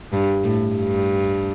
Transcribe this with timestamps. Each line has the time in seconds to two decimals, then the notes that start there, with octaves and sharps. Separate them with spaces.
0.13 G2
0.44 A2
0.75 G2